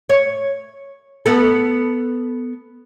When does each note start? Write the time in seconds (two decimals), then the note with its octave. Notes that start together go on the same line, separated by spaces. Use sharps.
0.09 C#5
1.26 B3 A4